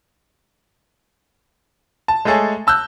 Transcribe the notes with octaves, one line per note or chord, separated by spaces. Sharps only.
A5
G#3 A3 G#4 A4 C#5
A5 E6 F#6 G6